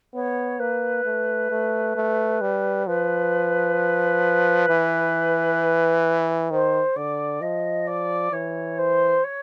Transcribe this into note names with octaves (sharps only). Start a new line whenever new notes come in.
B3 C#5
A#3 B4
A3
A3
A3
G3
F3 B4
E3
D#3 C5
D3 D5
F3 D#5
D5
E3 C#5
C5
C#5